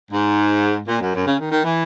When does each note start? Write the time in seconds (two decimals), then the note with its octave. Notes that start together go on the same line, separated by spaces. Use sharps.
0.12 G#2
0.88 A#2
1.01 F#2
1.14 F#2
1.26 C#3
1.40 D#3
1.52 D#3
1.64 E3